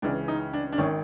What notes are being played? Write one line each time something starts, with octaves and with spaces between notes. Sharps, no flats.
C#2 C#3 E3 D4
D#4
D4
D4
G#1 D#3 C#4